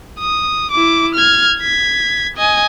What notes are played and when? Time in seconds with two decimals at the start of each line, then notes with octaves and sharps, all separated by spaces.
0.19 D#6
0.71 E4 D6
1.15 F6 G#6
1.60 G#6 B6
2.37 D#5 G#5